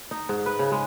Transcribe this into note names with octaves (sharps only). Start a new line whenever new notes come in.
D#4
G#2
B4
C#3
G#3